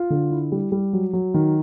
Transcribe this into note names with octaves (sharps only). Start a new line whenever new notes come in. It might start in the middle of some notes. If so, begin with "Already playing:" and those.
Already playing: F4
D3
E4
G3
G3
F#3
F#3
D#3